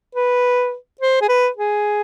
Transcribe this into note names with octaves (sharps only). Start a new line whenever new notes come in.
B4
C5
G#4
B4
G#4